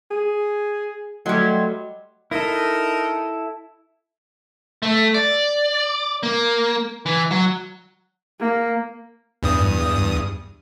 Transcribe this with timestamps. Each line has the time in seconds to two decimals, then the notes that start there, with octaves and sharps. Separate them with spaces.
0.11 G#4
1.26 F#3 G3 A3 D#5 G5 C6
2.31 D#4 E4 A4 A#4
4.83 A3
5.14 D5
6.23 A#3
7.06 E3
7.31 F#3
8.40 A#3
9.43 E2 G2 D#6